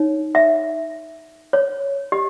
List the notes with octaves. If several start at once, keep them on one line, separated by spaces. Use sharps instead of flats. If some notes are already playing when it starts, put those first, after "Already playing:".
Already playing: D#4 C#5
E5
C#5
G4 D#5